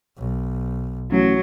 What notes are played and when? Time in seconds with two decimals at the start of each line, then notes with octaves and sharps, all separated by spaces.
0.18 B1
1.11 A1 F#3